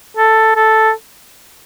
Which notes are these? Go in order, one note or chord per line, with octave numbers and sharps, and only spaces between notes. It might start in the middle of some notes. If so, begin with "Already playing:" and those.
A4
A4